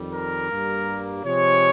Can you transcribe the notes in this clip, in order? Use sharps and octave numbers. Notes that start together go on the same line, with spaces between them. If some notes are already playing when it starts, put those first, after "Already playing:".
Already playing: F2 D#3 G3
A#4
G2 G3 A#3
C3 F3 G#3 C#5